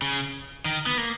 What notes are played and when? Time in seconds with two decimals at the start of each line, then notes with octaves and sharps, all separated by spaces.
0.02 C#3
0.65 D#3
0.86 B3
0.97 A#3